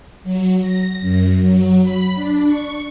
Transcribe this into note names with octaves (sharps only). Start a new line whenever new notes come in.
F#3
A#6
F#2
F#3
B5
D4
C#6